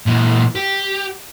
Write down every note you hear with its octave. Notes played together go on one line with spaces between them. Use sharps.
A#2 E3
G4